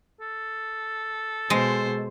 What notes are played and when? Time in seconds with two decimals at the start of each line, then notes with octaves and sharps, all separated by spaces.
0.21 A4
1.50 B2 G#3 C5